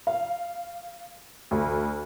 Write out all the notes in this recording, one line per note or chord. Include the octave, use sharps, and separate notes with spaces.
F5
D2